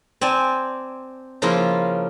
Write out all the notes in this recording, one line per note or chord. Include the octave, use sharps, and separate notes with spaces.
C4 D5 G#5 A5
C#3 F3 A#3 E4 F4 A#5